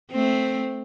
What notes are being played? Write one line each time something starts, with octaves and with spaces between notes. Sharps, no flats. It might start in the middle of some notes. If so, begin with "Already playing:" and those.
A3 C4